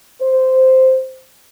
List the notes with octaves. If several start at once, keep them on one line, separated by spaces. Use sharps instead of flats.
C5